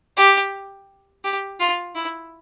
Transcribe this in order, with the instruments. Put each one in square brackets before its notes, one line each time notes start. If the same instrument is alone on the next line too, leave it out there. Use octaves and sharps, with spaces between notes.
[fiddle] G4
G4
F4
E4